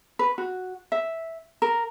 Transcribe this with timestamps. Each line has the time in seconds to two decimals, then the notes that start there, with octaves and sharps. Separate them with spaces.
0.19 B4
0.38 F#4
0.92 E5
1.62 A#4